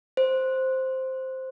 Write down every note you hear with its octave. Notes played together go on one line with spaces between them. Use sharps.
C5